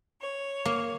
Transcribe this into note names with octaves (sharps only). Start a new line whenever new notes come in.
C#5
A#3